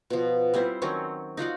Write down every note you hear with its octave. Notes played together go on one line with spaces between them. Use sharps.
B2 F3
G3 C4 E4 C5
D#3 F#3 C4 C#4
D#4 F4 F#4 D5